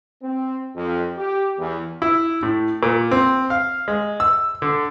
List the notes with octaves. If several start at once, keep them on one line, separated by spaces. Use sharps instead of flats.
C4
F2
G4
E2
E4
A2
A#2
C4
F5
G#3
E6
D3